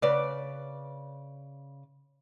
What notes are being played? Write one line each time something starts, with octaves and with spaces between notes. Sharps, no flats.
C#3 B4 D5